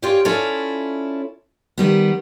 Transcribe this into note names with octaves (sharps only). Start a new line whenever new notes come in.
F4 G4 G#4 C#5 D5
C#4 E4 F4 A4 C#5 D5
D#3 G3 B3